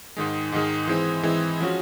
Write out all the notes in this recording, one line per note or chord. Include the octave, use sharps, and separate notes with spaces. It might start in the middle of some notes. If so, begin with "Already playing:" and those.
G#2 D#3 G#3
G#2 D#3 G#3
E3 G#3 C4
E3 G#3 C4
F3 G#3 C#4 F#4